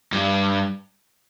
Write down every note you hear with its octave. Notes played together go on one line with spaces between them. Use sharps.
G2